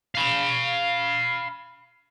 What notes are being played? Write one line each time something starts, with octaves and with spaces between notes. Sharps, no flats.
F5 B5